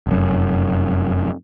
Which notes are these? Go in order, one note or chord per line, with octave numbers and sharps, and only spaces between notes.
F1 F#2